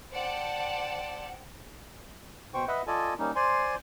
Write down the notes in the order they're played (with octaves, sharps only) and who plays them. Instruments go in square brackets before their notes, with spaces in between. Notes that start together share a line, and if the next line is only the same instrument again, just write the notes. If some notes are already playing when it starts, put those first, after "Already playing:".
[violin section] C5 D5 F#5 G5 A5
[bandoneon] B2 C5 G5 C#6
B4 D#5 E5 F#5
F4 A4 D5 D#5 G#5 A5
G3 A#3 C#4 D#4
C5 D5 G#5 C6